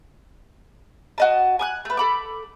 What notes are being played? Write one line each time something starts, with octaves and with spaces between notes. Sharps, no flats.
F#4 D#5 A5
G#5 D6 F#6
A3 B4
A4 B5 D6